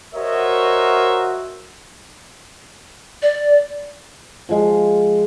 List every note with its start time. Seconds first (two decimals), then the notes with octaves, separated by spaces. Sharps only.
0.15 F#4 A#4 C5 C#5 D#5 E5
3.22 D5
4.49 F3 G#3